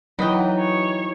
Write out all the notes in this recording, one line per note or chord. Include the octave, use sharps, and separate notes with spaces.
E3 F#3 D#4 B4 D#5 G5
C#5